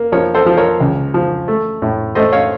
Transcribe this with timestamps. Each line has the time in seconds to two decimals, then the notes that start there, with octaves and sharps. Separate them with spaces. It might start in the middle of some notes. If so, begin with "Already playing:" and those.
Already playing: A#3
0.12 F3 A#4 C#5
0.35 A4 C5
0.46 F3
0.57 A#4 C#5
0.80 C#2
1.14 F3
1.48 A3
1.82 A2
2.15 A3 C5 D#5
2.32 C#5 F5